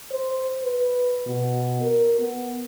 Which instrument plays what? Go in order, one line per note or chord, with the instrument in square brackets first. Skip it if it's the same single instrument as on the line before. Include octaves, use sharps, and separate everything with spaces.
[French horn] C5
B4
B2
A#4
B3